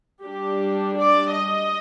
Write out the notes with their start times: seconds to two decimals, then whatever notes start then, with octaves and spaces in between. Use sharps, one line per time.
0.24 G3 D4 G4
0.98 D5
1.34 D#5